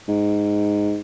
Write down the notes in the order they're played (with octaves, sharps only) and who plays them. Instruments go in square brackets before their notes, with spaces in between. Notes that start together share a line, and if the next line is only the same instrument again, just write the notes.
[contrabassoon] G#2